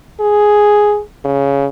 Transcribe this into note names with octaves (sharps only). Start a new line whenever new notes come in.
G#4
C#3